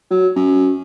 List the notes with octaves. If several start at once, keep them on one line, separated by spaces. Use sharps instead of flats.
F#3
F#2